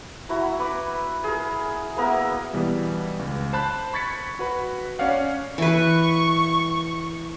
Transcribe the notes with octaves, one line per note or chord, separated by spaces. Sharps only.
E4 F#4 A#5
B4 B5 D6
G#4 A#4
A#3 B3 A#4 E5
B2 E3 G3 B3
C#2
C5 A5 B5 F#6
B5 C#6 G#6 A6 B6 C#7
F#4 B4 B5
C#4 C#5 D5 F5 F#5
E3 B4 C#6